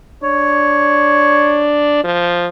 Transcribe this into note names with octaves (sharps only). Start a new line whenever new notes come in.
D4 C#5
F3